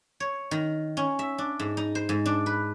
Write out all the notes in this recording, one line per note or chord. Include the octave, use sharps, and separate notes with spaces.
C#5
D#3
C#4
E5
D4
G#2
D#4
C5
G#2
D4
B4